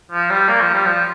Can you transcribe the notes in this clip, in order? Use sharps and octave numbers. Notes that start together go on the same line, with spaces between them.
F3
G3
A#3
F3
G3
F3